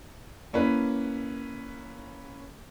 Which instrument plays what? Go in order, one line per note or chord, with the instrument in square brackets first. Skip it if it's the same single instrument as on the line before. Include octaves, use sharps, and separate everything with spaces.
[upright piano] A#3 C#4 E4 B4